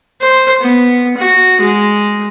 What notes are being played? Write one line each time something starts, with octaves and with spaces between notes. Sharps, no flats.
C5
B3
F#4
G#3